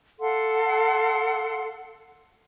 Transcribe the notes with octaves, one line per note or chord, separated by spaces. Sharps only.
A4 F5 F#5 C6